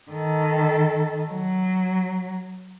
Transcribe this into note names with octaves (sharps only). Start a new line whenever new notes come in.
D#3 A4
F#3